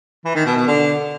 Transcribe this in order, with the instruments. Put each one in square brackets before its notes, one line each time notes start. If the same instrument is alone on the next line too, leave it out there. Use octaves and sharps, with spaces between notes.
[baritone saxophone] E3
D#3
B2
B2
D3